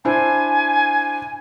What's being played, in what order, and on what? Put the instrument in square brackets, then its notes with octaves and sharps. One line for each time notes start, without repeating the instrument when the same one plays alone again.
[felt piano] D4 E4 C5 [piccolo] G#5